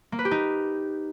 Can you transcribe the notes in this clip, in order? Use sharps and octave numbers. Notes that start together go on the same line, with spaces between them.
A#3
B4
G4
D#4